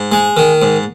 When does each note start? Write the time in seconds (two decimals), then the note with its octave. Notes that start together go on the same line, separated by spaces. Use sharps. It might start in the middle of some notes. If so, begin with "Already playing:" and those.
Already playing: G#2
0.12 G#3
0.37 D#3
0.62 G#2